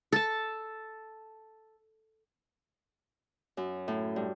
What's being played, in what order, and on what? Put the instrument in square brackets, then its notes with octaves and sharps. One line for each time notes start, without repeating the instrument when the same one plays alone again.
[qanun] A4 A5
[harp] F#2
A2
G2